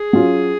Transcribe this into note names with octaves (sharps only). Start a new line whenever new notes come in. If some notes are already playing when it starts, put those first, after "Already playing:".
Already playing: G#4
F#3 C#4 F4